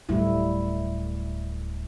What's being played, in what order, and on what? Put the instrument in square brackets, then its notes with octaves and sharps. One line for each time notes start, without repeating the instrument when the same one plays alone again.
[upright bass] D1 [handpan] G3 A3 E4